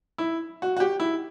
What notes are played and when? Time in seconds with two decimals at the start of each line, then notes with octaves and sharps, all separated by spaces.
0.18 E4
0.62 F#4
0.77 F#4
0.80 G4
1.00 E4